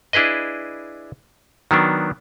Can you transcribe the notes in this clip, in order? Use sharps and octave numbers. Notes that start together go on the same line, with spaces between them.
D4 E4 G#4 B4 D#5
D#3 F#3 B3 D4